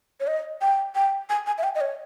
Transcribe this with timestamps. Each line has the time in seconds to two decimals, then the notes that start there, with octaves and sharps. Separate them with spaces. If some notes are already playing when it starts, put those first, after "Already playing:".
0.20 C#5
0.27 D#5
0.61 G5
0.95 G5
1.29 G#5
1.46 G#5
1.58 E5
1.63 G5
1.75 D#5
1.81 C#5